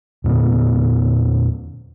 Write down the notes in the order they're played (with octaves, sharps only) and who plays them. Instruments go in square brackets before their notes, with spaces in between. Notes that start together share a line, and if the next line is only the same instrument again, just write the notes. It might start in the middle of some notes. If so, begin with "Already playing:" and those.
[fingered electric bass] E2 A#2 D3 B3